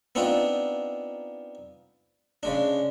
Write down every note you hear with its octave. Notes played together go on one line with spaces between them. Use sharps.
B3 C4 D4 D#4 F4
C#3 G#3 D4